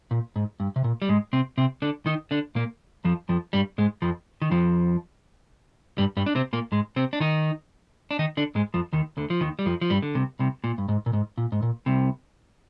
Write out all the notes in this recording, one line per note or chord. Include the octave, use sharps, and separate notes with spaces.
A#2
G#2
G2
C3
A#2
G3
G#2 G#3
C3 C4
C3 C4
D3 D4
D#3 D#4
D3 D4
A#2 A#3
F2 F3
F2 F3
G2 G3
G#2 G#3
F2 F3
D#3
F2 F3
G2 G3
G2 G3
D4
C3 C4
A#2 A#3
G#2 G#3
C3 C4
D4
D#3 D#4
D4
D#3 D#4
D3 D4
G#2 G#3
F2 F3
D#2 D#3
D2 D3
F3
D#2 D#3
G3
F2 F3
F3
G2 G3
D3
C2 C3
C2 C3
A#2
G2
G#2
A#2
G#2
A#2
G#2
A#2
C2 C3